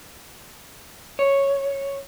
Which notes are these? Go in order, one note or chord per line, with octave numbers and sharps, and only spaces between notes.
C#5